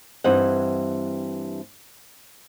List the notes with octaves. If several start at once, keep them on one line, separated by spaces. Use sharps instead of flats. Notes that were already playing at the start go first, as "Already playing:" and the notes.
G2 E3 C4 D#5 F#5